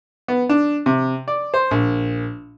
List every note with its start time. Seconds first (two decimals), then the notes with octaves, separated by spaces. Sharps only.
0.28 B3
0.49 D4
0.86 C3
1.28 D5
1.54 C5
1.71 A#1